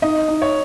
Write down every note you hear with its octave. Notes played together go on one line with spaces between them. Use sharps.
D#4 D#5
D#4
C#5